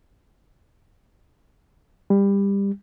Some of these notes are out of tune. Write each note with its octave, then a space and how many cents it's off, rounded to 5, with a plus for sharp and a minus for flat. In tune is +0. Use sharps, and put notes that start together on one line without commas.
G3 +20